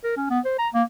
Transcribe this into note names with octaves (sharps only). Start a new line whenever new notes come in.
A#4
C#4
B3
C5
A#5
A#3